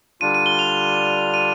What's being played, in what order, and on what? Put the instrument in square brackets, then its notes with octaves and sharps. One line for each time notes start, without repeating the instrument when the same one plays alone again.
[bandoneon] D3 G3 D4 F4 [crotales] D#7
[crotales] D#7
G7
F7
D#7